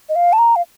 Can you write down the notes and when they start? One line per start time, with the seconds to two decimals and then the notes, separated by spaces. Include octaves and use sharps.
0.09 D#5
0.15 F5
0.33 A5
0.38 A#5
0.56 F5